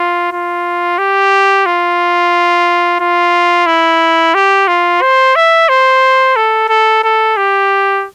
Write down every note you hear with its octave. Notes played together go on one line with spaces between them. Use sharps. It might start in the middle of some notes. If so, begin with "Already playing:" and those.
Already playing: F4
F4
G4
F4
F4
E4
G4
F4
C5
E5
C5
A4
A4
A4
G4